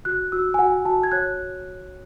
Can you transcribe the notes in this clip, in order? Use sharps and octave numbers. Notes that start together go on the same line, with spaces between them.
F#4 F#6
F#4 E6
G#5
F#4 F#5
F#4 A5
G#6
C#5 F#6